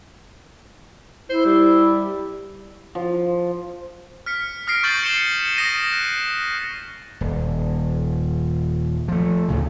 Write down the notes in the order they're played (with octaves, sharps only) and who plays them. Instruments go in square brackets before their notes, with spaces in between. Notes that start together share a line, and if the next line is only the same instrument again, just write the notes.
[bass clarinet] E4 [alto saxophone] C5
[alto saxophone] G3
[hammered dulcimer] F3
[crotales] F6 B6 C#7
D#6 F6 A#6 C7 D7
C#6 G6 A6 D#7 F#7
C#7 E7 G7
D#6 A#6 D#7
F#6
[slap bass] D#1
F3 A3
D2 A2 C#3